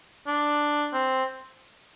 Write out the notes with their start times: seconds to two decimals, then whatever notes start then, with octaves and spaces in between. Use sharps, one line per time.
0.27 D4
0.93 C4